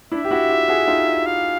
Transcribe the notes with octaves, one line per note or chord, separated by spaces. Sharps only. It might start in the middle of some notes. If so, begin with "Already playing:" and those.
D4 E4 E5
G4
E4 F#4
F4 G4
F#4 G#4
D#4 F4
F5